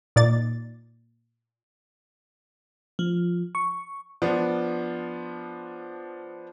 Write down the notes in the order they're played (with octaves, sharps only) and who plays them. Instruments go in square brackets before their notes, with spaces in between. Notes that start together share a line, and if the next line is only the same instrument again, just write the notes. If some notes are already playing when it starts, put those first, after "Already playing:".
[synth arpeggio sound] A#2 D#4 D5 A6
[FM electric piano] F3
C#6
[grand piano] F3 B3 D4